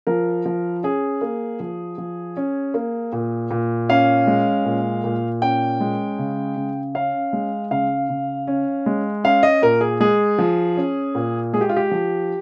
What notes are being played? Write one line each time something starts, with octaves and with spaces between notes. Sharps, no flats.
F3 A#4
F3
C#4 G#4
A#3
F3
F3
C#4
A#3
A#2
A#2
C#4 F5
G#3
A#2
A#2
C#4 G5
G#3
C#3
C#3
C#4 F5
G#3
C#3 F5
C#3
C#4
G#3
C#4 F5
D#5
A#2 A#4
G#4
G#3 G#4
F3
C#4
A#2
G#3 G#4
G4
F4
G4
F3